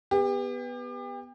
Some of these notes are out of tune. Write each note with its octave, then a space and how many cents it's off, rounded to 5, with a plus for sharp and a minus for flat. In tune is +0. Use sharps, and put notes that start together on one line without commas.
B3 +0 G4 +35